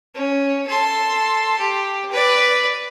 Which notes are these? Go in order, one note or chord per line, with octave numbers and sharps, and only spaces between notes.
C#4
A4 C6
G4
B4 D5